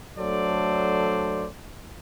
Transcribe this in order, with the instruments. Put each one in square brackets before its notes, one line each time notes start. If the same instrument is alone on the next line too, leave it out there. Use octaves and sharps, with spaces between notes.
[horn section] F#3 A3 D4 A4 C5 D5